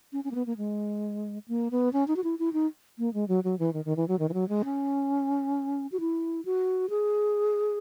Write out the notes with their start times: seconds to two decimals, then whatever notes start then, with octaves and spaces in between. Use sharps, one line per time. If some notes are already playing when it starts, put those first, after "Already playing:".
0.13 C#4
0.24 C#4
0.31 A#3
0.35 B3
0.46 A#3
0.57 G#3
1.48 A#3
1.71 B3
1.93 C#4
2.08 D#4
2.16 F#4
2.24 E4
2.39 E4
2.53 D#4
2.99 A#3
3.14 G#3
3.28 F#3
3.44 F#3
3.59 E3
3.73 D#3
3.85 D#3
3.97 E3
4.08 F#3
4.19 D#3
4.29 E3
4.34 F#3
4.49 G#3
4.65 C#4
5.92 F#4
6.00 E4
6.45 F#4
6.90 G#4